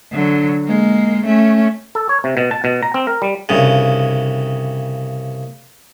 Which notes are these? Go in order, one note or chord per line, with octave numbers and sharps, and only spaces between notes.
D3 F#3
G#3 A#3
A3 C#4
A4
C#5
C3
B2
A5
B2
A#5
C4
A#4
G3
C2 G2 C#3